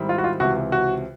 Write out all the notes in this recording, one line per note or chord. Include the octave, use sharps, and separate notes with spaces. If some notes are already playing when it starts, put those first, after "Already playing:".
Already playing: G#2 D#3 G3 C4 E4
F4
F#4
F4
C#2 C3 E3 F#4
F#4